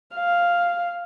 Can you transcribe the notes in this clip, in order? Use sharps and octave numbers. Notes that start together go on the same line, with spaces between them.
F5